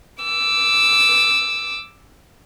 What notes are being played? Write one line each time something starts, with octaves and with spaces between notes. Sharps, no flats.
D6 E6